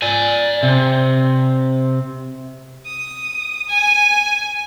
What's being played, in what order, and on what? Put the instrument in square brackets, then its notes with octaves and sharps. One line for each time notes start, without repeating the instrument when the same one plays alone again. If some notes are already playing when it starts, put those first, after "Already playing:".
[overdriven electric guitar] D5 G#5
C3
[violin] D#6
G#5